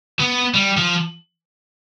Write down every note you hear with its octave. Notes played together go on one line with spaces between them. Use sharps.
B3
G3
F3